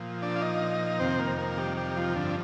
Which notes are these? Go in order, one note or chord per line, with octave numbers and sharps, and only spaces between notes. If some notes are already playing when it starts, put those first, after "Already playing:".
Already playing: A#2 F3
D4 D5
F5
D#4 D#5
F2 C3 D#3 C4 C5
A#3 A#4
A#3 A#4
G3 G4
G3 G4
F3 F4
G2 D3 F3 D4